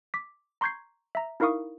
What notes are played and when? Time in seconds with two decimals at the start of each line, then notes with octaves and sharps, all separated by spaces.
0.14 D6 B6
0.61 A#5 C6 C#6 G6 G#6 C7
1.15 E5 A#5
1.40 D#4 E4 A#4 F5 C#6 D#6